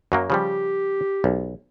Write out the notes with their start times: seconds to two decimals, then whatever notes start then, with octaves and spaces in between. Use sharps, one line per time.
0.12 F#2 F#3 A#3
0.30 C#3 F3 G3 G4
1.24 B1